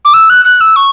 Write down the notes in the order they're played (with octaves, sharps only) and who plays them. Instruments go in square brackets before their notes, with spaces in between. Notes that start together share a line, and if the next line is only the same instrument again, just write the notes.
[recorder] D6
E6
F#6
F#6
E6
C#6